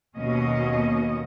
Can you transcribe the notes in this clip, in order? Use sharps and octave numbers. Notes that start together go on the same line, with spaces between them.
D#2 B2 C#4 D#5